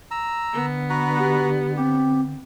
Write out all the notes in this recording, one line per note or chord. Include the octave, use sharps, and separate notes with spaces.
A#5 E6
D3 B3
F#4 B4 A#5
G4
C4 G4